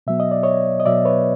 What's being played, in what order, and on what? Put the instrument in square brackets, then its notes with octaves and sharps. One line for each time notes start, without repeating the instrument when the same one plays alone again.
[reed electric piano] B2 F#3 B3 E5
D#5
D5
C#5 D#5
D#5
B2 F#3 B3 D5 E5
B4 C#5